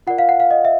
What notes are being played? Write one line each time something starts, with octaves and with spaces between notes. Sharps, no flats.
F4 A#4 D5 F#5
F5
F#5
F5
D#5
E5